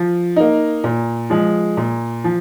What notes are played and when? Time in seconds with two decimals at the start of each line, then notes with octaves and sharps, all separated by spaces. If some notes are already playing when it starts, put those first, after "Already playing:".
Already playing: F3
0.36 A#3 D#4
0.84 A#2
1.30 F3 G#3
1.77 A#2
2.24 F3